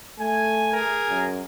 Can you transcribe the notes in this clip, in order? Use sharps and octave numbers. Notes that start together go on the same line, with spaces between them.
A3 G#5
G#4 A#4 G#5
F#2